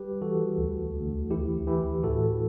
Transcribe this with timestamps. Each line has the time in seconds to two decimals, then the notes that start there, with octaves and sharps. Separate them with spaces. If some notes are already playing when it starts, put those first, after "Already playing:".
Already playing: G3 G4 B4
0.22 E3 F#4 A4
0.58 D2
0.94 D2
1.31 E3 E4 G4
1.67 E3 E4 G4
2.03 A2 F#4 A4